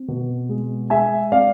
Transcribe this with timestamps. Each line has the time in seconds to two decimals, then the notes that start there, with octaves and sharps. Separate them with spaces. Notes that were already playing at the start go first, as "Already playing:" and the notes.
Already playing: C4
0.08 B2
0.49 G#3
0.90 G#3 E5 G#5
1.32 C4 D5 F5